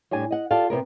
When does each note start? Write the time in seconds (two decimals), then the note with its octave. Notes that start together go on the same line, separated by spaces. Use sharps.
0.11 A2 G3 D4 G#5
0.31 D#5 F#5
0.51 F4 G4 A4 D5 F5
0.70 C3 E3 B3 A#4